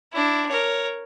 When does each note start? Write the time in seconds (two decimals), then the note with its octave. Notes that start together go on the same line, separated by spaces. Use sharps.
0.13 D4 E4
0.49 A#4 C#5